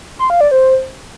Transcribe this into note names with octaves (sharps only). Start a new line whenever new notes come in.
C6
F5
D5
C5